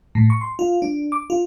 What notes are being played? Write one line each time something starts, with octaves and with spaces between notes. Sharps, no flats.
A2
C#6
C6
F4
D4
D6
F4